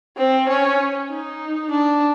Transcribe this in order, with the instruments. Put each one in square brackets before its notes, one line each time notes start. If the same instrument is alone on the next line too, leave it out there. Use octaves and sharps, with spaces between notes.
[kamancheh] C4
C#4
D#4
D4